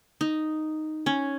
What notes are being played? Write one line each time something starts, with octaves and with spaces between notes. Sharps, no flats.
D#4
C#4